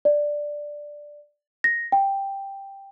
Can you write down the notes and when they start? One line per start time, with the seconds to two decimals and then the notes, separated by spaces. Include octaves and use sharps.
0.05 D5
1.64 A#6
1.92 G5